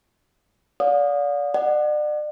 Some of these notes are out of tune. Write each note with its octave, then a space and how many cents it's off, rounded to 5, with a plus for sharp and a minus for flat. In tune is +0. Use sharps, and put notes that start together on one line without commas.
D5 -30 F5 +40 D#6 -15
D5 +40 F#5 +0